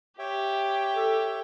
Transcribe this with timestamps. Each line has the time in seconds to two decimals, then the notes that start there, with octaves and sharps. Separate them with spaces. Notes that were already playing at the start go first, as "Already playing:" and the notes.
0.19 G4 C#5 E5 G5
0.95 A4